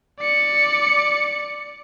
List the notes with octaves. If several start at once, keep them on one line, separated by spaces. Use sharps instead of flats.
D5 C#7